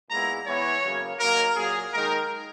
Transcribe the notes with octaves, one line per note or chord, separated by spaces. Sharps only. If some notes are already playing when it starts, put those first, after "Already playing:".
A#2 G#3 B3 E4 A#5
E3 B3 E4 C#5
C#3 F#3 A#3
D#3 F#3 A#3 A#4
A#2 F#3 A#3 G#4
D#3 G#3 D#4 A#4